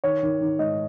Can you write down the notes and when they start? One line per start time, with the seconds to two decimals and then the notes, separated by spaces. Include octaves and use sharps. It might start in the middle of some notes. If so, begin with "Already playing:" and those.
0.04 D#3 C#5
0.23 D#3
0.41 D#3
0.59 G#2 D#5